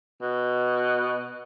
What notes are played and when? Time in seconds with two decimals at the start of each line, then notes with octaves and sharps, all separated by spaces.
0.22 B2